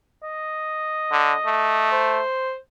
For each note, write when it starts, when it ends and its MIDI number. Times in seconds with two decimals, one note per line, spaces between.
0.23 1.88 75
1.11 1.33 50
1.46 2.20 57
1.92 2.56 72